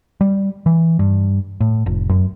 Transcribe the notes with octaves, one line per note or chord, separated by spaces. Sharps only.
G3
E3
G2
A2
F1
F#2